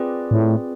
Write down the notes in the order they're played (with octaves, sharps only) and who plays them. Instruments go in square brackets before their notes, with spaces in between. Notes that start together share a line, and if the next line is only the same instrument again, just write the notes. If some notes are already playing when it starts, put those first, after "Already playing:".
Already playing: [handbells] C4 F4 G#4 B4 D5
[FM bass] A2